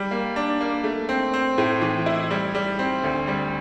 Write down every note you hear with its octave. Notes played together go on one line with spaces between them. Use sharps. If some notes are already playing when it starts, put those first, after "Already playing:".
Already playing: G3
A#3
D4
A#3
A3
C4
C4
A2
E3
E4
G3
G3
C4
D2
G3